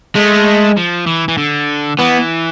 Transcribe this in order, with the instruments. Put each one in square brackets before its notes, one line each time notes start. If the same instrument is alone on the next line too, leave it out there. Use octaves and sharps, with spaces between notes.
[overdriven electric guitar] G#3 [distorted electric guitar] A3
[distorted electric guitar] F3
E3
E3
D3
[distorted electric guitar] E3 [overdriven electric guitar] B3